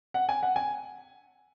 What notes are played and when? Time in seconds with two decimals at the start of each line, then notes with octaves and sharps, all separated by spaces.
0.14 F#5
0.29 G#5
0.43 F#5
0.56 G#5